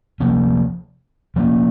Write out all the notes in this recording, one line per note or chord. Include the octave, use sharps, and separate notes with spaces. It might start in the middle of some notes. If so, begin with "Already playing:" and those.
C3 F3 A#3 C#4
F3 A#3 C#4